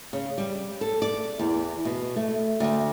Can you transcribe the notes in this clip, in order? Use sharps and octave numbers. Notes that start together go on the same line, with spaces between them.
C#3
G3
A4
D5
E2
B2
A3
D2